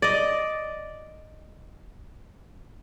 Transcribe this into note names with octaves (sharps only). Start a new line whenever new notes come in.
D5 D#5